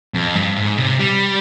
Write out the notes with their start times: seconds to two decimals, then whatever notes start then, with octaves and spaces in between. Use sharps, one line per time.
0.14 F2
0.35 G2
0.56 G#2
0.78 C3
0.99 G3